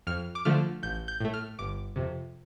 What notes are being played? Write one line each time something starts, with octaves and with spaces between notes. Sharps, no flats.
F2 F6
D6
D3 F3 A3 F6
A1 G6
G6
A2 A3
F6
G1 D6
F2 C3